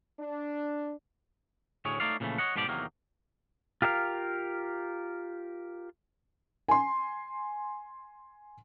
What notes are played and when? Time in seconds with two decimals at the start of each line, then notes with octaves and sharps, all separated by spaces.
0.19 D4
1.85 D2 A2 G#4 C#5
2.00 A3 D#4 C#5 D5 F5
2.20 A#2 C#3 E3 F3 A3
2.38 C#5 D#5 F#5
2.56 G#2 B2 F3 G4 A4 D5
2.68 E2 C3 D#3 F#3 A#3
3.82 F4 G4 A#4 E5 F5
6.68 G#5 C6